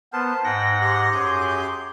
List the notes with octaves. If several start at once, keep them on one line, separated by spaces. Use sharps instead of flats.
B3 A#4 C5 A5
G#2 F#5 G5 A#6
G4 C6
F#2 G#4 G6